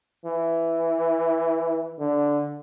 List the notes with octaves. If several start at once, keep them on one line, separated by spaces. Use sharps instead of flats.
E3
D3